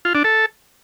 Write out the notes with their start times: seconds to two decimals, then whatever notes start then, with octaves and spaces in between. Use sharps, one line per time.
0.05 F4
0.15 D4
0.24 A4